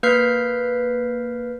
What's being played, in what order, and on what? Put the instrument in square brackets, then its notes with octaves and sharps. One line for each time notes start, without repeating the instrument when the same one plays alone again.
[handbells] A#3 B4 F6 G6 B6 C7